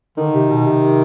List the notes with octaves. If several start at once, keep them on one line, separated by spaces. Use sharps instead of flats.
D3 D#3
C3
B2
C3